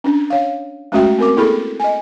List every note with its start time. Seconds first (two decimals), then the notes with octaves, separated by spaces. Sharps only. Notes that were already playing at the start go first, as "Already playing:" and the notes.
0.04 C#4 D4
0.30 C#5 F5
0.92 G#3 A3 C#4 F#4 E5 G5
1.19 C4 A#4 D6
1.37 A#3 E4 G#4 A4 B5
1.80 D#5 G#5